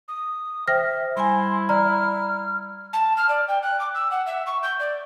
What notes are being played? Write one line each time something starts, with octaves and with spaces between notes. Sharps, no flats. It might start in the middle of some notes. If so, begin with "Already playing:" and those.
D#6
C5 E5 G5 F6 A#6
G3 E4 G#5 C6
D5 A#5 F6
A5
F6
D5
G5
F#6
D6
E6
F#5
E5
C#6
G6
D5